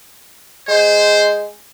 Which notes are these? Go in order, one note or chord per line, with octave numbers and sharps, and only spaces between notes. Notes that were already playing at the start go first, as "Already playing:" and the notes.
G#3 C5